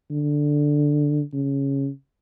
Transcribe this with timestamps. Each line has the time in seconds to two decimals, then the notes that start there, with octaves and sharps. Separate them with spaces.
0.11 D3
1.33 C#3